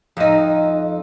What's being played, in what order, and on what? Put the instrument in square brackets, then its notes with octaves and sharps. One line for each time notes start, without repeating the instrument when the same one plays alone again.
[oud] F2 D#4